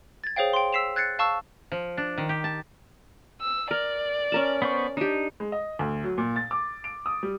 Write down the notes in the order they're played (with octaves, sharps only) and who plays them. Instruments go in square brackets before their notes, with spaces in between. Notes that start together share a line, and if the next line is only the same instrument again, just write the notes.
[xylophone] G#6 A6
G#4 C5 C#5 F5 G5
G5 C6
E6 B6 C7 E7 F7
F#6 G#6 A6 C7 C#7
F5 A5 C#6 E6
[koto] F3
D4
D#3
G4
A5
[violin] E6
[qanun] A#4 [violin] D5
[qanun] C#4 A#4 A5
[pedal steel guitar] B3 C5 C#6
[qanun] D4 G4 [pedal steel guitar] D#4
[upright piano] G#3
D#5
D2
F#3
A#2
A6
D6
D7
D#6
G3